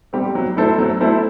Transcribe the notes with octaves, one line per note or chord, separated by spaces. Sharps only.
G3 C4 G4
F#3
A3 E4 A4 C5
F#3
A3 E4 A4 C5